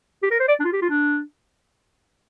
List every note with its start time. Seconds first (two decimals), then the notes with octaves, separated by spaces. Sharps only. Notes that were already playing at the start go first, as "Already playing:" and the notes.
0.23 G4
0.31 A#4
0.40 C5
0.48 D5
0.60 D4
0.65 F4
0.72 G4
0.82 F4
0.90 D4